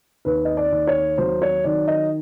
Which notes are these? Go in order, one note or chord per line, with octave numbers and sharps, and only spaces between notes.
D#2 B4
D#5
D5
D#2
C#5
F#3 C5
C#5
D#3 D5
D#5